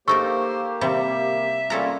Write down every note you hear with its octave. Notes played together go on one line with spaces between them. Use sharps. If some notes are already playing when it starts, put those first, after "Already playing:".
A3 A#3 D#4 G4 A#4 C5 C#6 E6
C3 G3 E5
G3 A#3 C#4 F4 A4 A#5